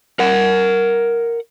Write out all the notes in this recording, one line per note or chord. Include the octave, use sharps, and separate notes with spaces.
A#4 F#5